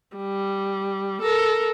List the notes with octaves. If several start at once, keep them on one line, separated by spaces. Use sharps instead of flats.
G3
A4 A#4